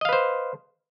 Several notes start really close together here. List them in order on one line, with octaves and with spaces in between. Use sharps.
D#5 F5 B4 C5